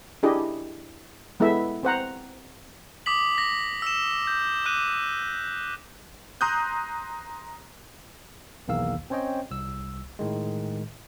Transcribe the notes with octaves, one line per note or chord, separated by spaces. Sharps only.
D4 E4 G4 G#4 D#5
G#3 B3 E4 A4 E5
C4 C5 F#5 A#5
D6 D#6 B6 F#7
A#6 B6
E6 E7
G6
D6 F#6 D#7
A#5 C6 D#6 F#6 G6
B1 E2 D#3 A#3 F5 E6
C4 C#4 C5 C#5 D#5 G5
C2 E6
A2 D#3 G#3